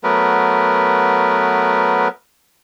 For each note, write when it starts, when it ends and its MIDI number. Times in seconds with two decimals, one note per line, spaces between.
0.04 2.08 54
0.04 2.08 57
0.04 2.08 59
0.04 2.08 70
0.04 2.08 71